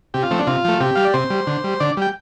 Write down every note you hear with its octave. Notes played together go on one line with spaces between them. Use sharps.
C3 G4
F4
F3 A3 C4
D4
C3 F4
F3 A3
C3 G4
G3 F5
D5
C3 C5
G3
D3
G3
D3 D5
G3 G5